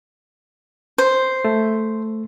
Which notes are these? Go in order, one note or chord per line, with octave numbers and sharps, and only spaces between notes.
C5
A3